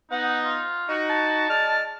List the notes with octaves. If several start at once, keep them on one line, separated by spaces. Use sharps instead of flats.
B3 D#4 F#5
F4
D#4 F#4
A5
G#3 D5 F6